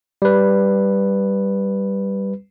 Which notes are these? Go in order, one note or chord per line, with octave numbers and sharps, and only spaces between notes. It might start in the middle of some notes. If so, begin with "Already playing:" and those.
G3 B4